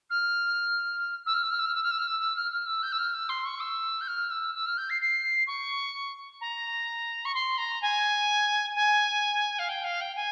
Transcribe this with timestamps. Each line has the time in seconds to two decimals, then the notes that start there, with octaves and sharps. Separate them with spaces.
0.10 F6
1.26 E6
1.33 F6
1.42 E6
1.50 F6
1.59 E6
1.66 F6
1.75 E6
1.82 F6
1.90 E6
1.98 F6
2.06 E6
2.19 E6
2.35 F6
2.51 F6
2.66 E6
2.82 G6
2.92 E6
2.98 F6
3.13 E6
3.29 C6
3.45 C#6
3.60 E6
4.01 G6
4.07 F6
4.30 E6
4.54 E6
4.66 F6
4.77 G6
4.89 C7
5.01 C7
5.47 C#6
6.40 A#5
7.25 C#6
7.34 C6
7.57 A#5
7.82 G#5
8.75 G#5
9.58 F5
9.69 G5
9.84 F5
10.00 G5
10.15 G#5